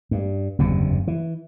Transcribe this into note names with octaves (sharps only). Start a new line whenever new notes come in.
G2
F#1 E2 G2 C3
E3